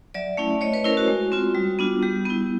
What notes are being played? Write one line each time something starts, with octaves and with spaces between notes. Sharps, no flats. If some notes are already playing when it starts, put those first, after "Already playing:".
F#3 D5 E5
A3 C#4 E4
A3 C#5 D#5
B4 C#5
C#4 E4 A#4 C5
F#4
G#3
C4 F4
G3
B3 D4 F4
G3 G4
B3 E4